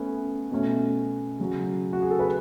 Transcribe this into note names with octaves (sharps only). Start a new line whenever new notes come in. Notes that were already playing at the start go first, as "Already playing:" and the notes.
Already playing: A3 B3 C#4
B2 A3 C#4
C#3 F#3 C#4
F#4
G#4
A4
B4